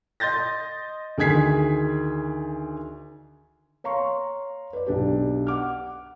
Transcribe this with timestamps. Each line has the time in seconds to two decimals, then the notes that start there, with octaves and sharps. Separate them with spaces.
0.20 D#5 C6 G6 A6 A#6
1.18 D2 D#3 G#4 G#6 B6 C7
3.84 C#5 F5 A#5 C6 C#6
4.73 B4 D5
4.87 B1 D4 G4
5.47 F#5 D6 F6